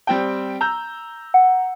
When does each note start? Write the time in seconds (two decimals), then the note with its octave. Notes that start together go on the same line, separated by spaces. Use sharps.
0.07 G3 C4 G5
0.61 A#5 E6 G6
1.34 F#5